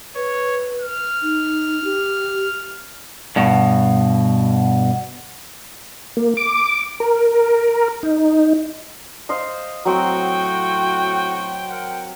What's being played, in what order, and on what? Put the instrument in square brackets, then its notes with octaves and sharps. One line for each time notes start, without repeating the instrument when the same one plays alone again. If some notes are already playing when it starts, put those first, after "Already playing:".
[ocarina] B4 [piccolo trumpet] C#5
[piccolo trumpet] F6
[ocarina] D#4
G4
[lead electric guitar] G2 B2
[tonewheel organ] A#3
D6
A#4
D#4
[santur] C5 D#5 F5
[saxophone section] A2 F#4 [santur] F#3 C4 [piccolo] G5
[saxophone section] A#4 F#5